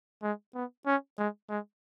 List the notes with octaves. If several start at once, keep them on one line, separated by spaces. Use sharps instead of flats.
G#3
B3
C#4
G#3
G#3